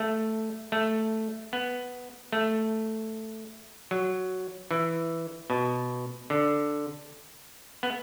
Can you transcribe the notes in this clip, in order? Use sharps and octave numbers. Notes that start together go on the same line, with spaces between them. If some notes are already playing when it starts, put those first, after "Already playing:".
Already playing: A3
A3
B3
A3
F#3
E3
B2
D3
B3